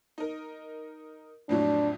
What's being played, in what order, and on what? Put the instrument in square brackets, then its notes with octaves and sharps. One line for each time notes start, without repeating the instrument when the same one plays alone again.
[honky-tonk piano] D#4 A#4
[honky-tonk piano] F2 A2 F#3 [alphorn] D4